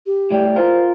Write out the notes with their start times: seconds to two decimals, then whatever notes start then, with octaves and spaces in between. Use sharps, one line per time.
0.06 G4
0.31 A2 G3
0.56 F4 A#4 C5